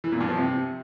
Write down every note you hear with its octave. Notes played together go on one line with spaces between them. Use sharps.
E3
A#2
G2
F3
C3